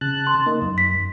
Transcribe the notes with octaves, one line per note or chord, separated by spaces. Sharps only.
C#3 A5 F#6
C6
A#3 D#4
F#2
B6